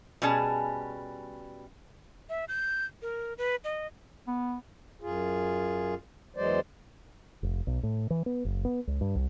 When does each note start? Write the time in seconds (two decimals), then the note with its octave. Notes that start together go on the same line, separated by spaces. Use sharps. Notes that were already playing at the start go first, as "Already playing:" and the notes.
0.22 B2 G3 C#4 G#4 A5
2.30 E5
2.48 G6
3.02 A#4
3.38 B4
3.64 D#5
4.28 B3
5.02 F#2 F4 G#4
6.36 E2 E3 F#3 G#3 C5 D5
7.43 F1
7.67 B1
7.83 A2
8.10 E3
8.26 B3
8.45 F#1
8.65 B3
8.87 C#2
9.01 G2
9.16 C2